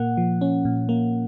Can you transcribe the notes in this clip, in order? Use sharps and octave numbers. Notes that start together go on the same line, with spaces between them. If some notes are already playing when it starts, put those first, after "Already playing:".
Already playing: A#2 A#3 F#5
F3
C#4
A#2
A#3